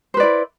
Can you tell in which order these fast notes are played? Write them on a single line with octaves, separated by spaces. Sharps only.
C5 B4 D5 E4